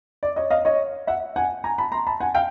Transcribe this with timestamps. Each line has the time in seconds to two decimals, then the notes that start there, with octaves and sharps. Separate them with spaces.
0.23 D5
0.36 C#5 D#5
0.50 D#5 F5
0.65 C#5 D#5
1.07 E5 F#5
1.36 F#5 G#5
1.64 G#5 A#5
1.78 A5 B5
1.92 A#5 C6
2.07 A5 B5
2.20 F#5 G#5
2.35 F5 G5